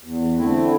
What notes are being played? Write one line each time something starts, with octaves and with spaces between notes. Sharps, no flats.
E2
D3 A3 C4 E4